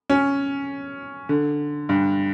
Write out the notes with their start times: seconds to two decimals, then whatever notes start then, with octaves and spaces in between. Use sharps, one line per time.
0.10 C#4
1.29 D3
1.89 G2